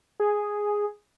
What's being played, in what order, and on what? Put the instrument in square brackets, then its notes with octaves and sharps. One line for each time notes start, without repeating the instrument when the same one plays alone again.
[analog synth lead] G#4